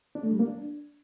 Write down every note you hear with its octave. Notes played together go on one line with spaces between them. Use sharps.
D4
A3
G3
A#3
D4